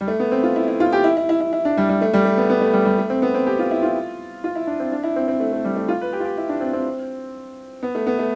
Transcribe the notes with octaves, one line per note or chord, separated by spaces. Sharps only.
G3
A3
B3
C4
F4
E4
E4
F4
G4
E4
E4
E4
E4
E4
D4
G3
G3
A3
G3
A3
B3
B3
A3
G3
G3
A3
C4
B3
C4
G4
F4
E4
F4
F4
E4
D4
C4
D4
E4
C4
C4
A3
A3
G3
A3
F4
B4
G4
F4
G4
E4
D4
C4
C4
B3
A3
B3
A3